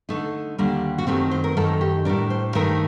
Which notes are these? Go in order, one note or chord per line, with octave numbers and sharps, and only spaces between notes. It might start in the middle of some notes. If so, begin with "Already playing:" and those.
D3 A3 D#4
D#2 D3 G3 A#3 D4
F#4
F#2 D#3 F#3 A3 C4 G4
C5
A#4
F#2 D#3 A3 D#4 A4
G4
A2 G3 D4 A#4
C5
G2 D#3 A3 D#4 A#4